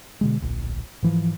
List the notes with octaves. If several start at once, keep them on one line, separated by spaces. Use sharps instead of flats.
B2 D3 G#3
D1 A#1
G#2 E3 F3